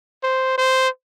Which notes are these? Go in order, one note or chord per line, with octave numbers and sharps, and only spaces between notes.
C5
C5